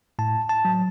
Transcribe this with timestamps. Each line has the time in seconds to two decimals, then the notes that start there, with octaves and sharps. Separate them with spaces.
0.19 A2 A5
0.49 A5
0.65 F#3